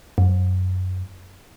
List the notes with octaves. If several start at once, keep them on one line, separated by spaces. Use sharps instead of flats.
F#2